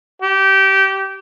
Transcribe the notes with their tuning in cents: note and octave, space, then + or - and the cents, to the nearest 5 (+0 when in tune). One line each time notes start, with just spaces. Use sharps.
G4 -20